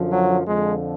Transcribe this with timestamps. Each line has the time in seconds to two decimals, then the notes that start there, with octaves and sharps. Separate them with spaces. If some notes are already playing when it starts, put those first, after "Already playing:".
Already playing: F#2 D3 F3
0.09 F#3
0.45 F2 D3 F3 G#3